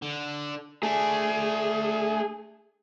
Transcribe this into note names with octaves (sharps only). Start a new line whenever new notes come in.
D3
A3 D4 G#4